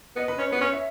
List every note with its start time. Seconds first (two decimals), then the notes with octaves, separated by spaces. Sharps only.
0.16 B3 D#5
0.28 B4
0.38 C#4 C#5
0.51 B3 B4
0.61 C#4 C#5
0.73 E5